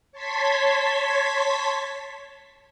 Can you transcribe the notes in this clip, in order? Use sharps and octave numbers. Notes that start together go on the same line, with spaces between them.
C#5 A5 C6 G#6 B6